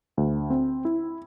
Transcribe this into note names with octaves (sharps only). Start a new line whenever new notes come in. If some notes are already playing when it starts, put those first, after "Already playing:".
D2
C4
E4